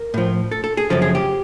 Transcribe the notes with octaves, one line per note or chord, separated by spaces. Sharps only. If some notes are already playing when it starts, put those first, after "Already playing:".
Already playing: A#4
A2 F3
A4
A4
G#4
F#2 C#3 F3 A4
G#4
G4